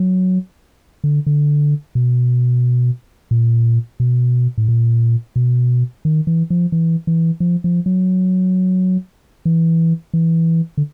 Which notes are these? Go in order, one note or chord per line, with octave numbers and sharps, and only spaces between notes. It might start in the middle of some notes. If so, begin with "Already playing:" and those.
Already playing: F#3
D3
D3
B2
A#2
B2
A2
A#2
B2
D#3
E3
F3
E3
E3
F3
F3
F#3
E3
E3
D3